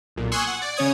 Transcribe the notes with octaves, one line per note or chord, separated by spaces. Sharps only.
B1 A#2
G#5 C6 C#6 D#6 E6 F#6
F#5
D5
C#3 C#4 C#5 D#6 G#6